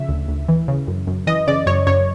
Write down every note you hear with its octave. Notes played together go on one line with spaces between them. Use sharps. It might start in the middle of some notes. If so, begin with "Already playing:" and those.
Already playing: C#3 F3 E5
D2
D2
E3
C#3
F#2
F#2
E3 D#5
C#3 D5
F#2 C#5
F#2 C#5